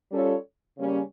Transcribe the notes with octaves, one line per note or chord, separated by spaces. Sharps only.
G3 C#4 F4 A4 C#5
C#3 G3 A#3 C#4